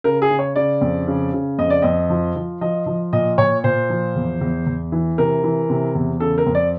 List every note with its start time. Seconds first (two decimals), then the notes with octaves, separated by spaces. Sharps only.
0.04 C#3 A#4
0.22 G#4
0.30 C#3
0.39 C#5
0.56 C#3 D5
0.81 F2
1.07 C#3
1.33 C#3
1.59 F2 D#5
1.70 D5
1.82 F2 D#5
2.10 F3
2.36 F3
2.61 F3 D#5
2.86 F3
3.13 A#2 D#5
3.38 A#2 C#5
3.64 A#2 C5
3.90 F3
4.15 E2
4.41 E2
4.67 E2
4.92 E3
5.18 C3 A#4
5.43 E3
5.70 C3
5.95 E2
6.20 C#3 A4
6.38 A#4
6.46 F2
6.55 D5